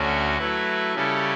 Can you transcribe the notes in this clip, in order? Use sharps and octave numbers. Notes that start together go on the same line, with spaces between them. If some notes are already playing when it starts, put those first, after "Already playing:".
Already playing: D2 D3 A3 C#4 F#4
F#3 A3 E4 B4
C#3 G3 C#4 E4 A4